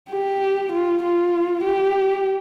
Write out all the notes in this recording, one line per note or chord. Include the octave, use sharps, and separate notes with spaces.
G4
F4
F4
G4